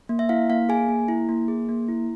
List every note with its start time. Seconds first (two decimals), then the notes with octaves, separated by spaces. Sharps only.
0.09 A#3
0.19 E5
0.29 E4 F5
0.50 A#3 F5
0.69 G#4 G#5
0.89 A#3
1.08 E4
1.29 A#3
1.48 G#4
1.69 A#3
1.89 E4